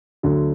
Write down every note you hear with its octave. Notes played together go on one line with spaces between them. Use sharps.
D2 D3 F#3